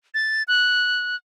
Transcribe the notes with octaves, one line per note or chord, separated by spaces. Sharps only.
A6
F#6